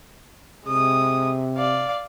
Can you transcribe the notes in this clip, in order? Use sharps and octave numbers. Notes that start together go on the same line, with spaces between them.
C3 G#3 D#6
D5 F5